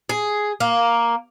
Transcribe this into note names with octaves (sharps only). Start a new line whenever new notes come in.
G#4
A#3